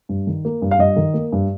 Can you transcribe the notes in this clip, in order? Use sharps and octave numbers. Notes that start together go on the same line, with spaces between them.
G2
D#3
A#3
G2
F5
G2 D#5
D#3
A#3
G2